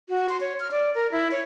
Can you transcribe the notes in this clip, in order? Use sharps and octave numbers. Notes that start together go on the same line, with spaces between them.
F#4
C6
C#5
F6
D5
A#4
E4
C#5